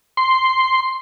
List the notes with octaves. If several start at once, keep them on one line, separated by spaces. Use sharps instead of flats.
C6